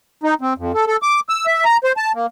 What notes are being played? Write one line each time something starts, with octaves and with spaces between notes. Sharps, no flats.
D#4
C4
F2
A4
A4
D6
E6
E5
A#5
C5
A5
A#3